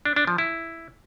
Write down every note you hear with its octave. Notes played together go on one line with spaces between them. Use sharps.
D4
D4
F3
E4